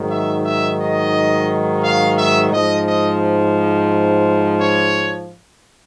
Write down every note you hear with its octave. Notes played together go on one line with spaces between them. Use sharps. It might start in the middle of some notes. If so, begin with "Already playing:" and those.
Already playing: G#2 D#3 F#3
E5
E5
D#5
F5
E5
G#2 F3 D#5
D#5
C#5